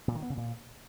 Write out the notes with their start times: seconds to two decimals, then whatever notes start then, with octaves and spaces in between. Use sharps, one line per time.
0.08 A#2
0.15 D#3
0.22 B3
0.30 C#3
0.37 A#2